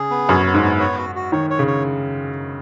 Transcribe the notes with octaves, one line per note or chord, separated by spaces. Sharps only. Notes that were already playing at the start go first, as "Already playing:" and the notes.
Already playing: C#3 G#4
B3
F#2 C#5
B3
G#2
B3
C#5
F#4
F#4
D#3 C#5
C#5
C#3
C#5